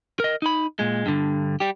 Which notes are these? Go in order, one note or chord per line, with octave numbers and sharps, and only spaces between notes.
A#4 D#5
D#4 B5
A#2 G#3
G2 D3
G3 G4